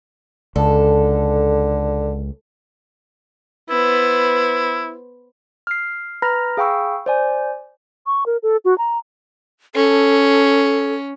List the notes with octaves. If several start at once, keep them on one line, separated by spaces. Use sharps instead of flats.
C#2 D3 A4
B3 E4 C5
F6 C7
B4 A#5 B5 F6 A#6
G#4 F5 G5 B5 C#6 E6
C5 D5 G#5
C#6
A#4
A4
F#4
A#5
C#4 A4